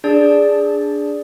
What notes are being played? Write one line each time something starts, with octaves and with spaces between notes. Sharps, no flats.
D4 G#4 D5 A5